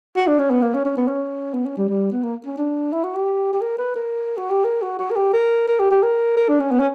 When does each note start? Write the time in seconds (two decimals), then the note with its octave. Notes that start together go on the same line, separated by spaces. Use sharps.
0.16 F#4
0.27 D4
0.39 C#4
0.50 B3
0.62 A#3
0.74 C#4
0.85 C#4
0.97 B3
1.08 C#4
1.53 B3
1.66 C#4
1.77 G3
1.89 G3
2.12 B3
2.23 A#3
2.46 C#4
2.57 D4
2.92 E4
3.03 F#4
3.15 G4
3.53 G4
3.61 A#4
3.78 B4
3.95 A#4
4.37 F#4
4.50 G4
4.64 A#4
4.82 F#4
4.99 F#4
5.10 A#4
5.16 G4
5.33 A#4
5.68 A#4
5.79 G4
5.91 G4
6.03 A#4
6.36 A#4
6.48 D4
6.60 C#4
6.71 B3
6.79 C#4